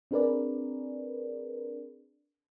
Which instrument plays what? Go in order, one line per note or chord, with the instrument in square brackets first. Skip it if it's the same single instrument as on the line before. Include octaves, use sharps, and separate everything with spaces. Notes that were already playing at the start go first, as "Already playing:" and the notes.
[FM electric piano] C4 D4 G#4 A#4 B4 D5